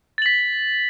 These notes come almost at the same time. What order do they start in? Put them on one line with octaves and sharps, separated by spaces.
A6 F#7 B6